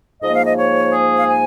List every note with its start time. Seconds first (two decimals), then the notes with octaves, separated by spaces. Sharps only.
0.23 G#2 F3 A#3 D#5
0.34 F5
0.45 D#5
0.58 C#5
0.93 G#4
1.18 F5
1.28 G#5